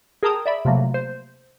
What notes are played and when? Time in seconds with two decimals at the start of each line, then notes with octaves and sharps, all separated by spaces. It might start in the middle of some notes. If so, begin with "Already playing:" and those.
0.23 G#4 A#4 G5 A5 A#5 D#6
0.46 D5 E5 B5
0.65 C3 F3 F#3 A3 A#3
0.94 C5